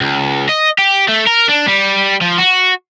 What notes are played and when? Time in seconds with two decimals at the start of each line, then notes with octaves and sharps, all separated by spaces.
0.01 C#2
0.49 D#5
0.78 G4
1.08 A3
1.27 A#4
1.48 D4
1.67 G3
2.21 F3
2.39 F#4